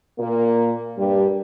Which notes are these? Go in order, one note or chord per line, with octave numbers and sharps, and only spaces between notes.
A#2 A#3
G2 G3